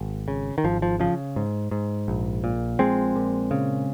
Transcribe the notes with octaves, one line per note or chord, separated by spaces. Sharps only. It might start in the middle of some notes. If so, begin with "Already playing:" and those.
Already playing: G#1
C#3
D#3
G#1 F3
F3
C#3 F3
G#2
G#2
A#1
A#2
A#1 G#3 C4
A#2
C#3